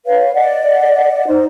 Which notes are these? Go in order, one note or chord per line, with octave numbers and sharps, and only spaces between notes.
B4 C#5 F5
D5 D#5 F#5
D#4 C5